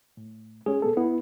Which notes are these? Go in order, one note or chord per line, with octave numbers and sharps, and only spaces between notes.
A2
G#3 C#4 G#4
A#2 B3 A4
B3 E4